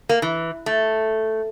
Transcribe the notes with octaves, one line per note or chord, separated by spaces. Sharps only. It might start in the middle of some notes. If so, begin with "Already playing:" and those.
A#3
E3
A3